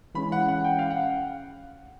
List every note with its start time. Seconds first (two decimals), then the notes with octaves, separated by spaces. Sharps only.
0.14 E3 G#3 C#4 B5
0.32 F#5
0.48 F#5
0.64 G5
0.79 F5
0.90 F#5